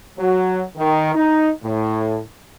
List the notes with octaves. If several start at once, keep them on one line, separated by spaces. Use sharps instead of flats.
F#3
D#3
D#4
A2